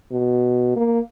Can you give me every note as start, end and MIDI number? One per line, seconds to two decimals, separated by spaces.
0.12 0.76 47
0.76 1.00 58